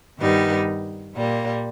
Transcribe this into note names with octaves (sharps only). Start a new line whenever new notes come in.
G2 D#3 G3 B3 D#4
A#2 G3 A#3